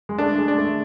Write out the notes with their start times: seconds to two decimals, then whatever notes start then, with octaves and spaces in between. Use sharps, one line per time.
0.09 G#3
0.18 A3 D4
0.38 G#3
0.48 D4
0.57 A3